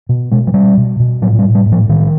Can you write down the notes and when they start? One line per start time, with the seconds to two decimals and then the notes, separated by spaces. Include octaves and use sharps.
0.09 B2
0.31 B2 G#3
0.47 F#3
0.54 B2 G3
0.77 B2
1.00 B2
1.22 A2 F#3
1.39 G3
1.45 A2
1.55 G3
1.66 A2
1.72 F3
1.89 A2 D#3